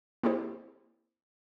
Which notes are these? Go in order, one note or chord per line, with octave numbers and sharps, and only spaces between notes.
A#3 C4 E4 G4 G#4 C5